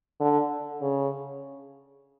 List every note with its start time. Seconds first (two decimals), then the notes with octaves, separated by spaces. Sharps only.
0.20 D3
0.81 C#3